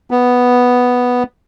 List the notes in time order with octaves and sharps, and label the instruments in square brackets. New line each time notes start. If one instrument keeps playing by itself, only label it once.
[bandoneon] B3